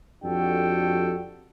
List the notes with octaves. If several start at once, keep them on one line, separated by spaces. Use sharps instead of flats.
F2 D4 F#4 G4 A4 G5